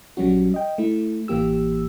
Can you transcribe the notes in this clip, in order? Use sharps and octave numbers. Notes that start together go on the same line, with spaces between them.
A#1 F#3 G3 C#4 F#4
D#5 G5
A3 E4
A1 E3 A#3 G4 E6